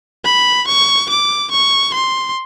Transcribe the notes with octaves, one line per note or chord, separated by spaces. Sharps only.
B5
C#6
D6
C#6
C6